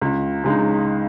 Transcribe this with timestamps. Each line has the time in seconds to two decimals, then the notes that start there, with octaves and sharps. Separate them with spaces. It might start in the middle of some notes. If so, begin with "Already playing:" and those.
0.01 C#2
0.44 C#3 G#3 D#4